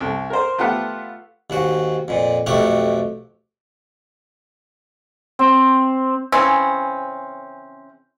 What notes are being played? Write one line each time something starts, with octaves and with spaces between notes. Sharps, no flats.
C2 A4
A#4 C5
A3 B3 F4 G4 F#5
D#2 G#2 F#4
F2 A#2
B1 F2 A3 G4 F#5 C#6
C4
C#3 E3 C4 C#4